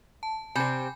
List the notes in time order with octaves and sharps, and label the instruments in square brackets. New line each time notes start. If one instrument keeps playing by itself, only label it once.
[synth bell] A5
[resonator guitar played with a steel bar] C3 C4 [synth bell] G#5 B5 G6